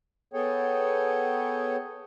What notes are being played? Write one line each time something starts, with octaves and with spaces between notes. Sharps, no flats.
B3 G#4 A4 C#5 G5